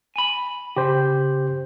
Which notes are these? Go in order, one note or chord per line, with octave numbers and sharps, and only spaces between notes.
G#5 B5
C#3 G4 C5